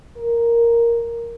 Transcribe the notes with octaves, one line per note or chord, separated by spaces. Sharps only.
A#4